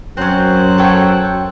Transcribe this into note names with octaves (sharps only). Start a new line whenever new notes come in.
F#2 F#3 C4 C#4 C5 F#6
A4 C#5 G5